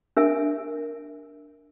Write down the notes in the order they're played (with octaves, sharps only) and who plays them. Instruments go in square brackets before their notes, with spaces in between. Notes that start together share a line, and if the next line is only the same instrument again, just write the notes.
[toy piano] D4 A#4 E5 G#5